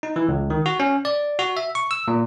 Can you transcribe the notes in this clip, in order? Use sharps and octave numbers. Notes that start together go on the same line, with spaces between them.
D#4
E3
C#2
D#3
F#4
C#4
D5
F#4
E5
C#6
E6
A#2